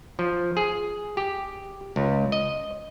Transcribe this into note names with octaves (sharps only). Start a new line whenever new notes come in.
F3
G#4
G4
C#2
D#5